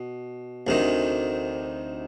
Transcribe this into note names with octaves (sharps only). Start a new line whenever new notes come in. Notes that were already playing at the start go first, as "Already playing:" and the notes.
Already playing: B2
D2 C3 D#3